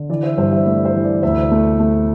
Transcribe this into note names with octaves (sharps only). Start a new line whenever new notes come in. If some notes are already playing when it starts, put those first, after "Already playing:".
Already playing: D3
E3 D5
C5 E5
G2 C5 E5
C5 E5
A3 D5
C5
E3
D5
D2 C5 E5
A3
A3